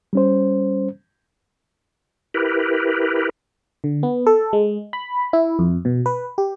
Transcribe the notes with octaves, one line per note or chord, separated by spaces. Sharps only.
G3 C#4 C5
E4 G4 A#4 B4
D3
B3
A4
G#3
B5
E4
F2
B2
B4
G4